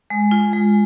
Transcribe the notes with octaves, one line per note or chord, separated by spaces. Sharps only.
G#3
F4
G#3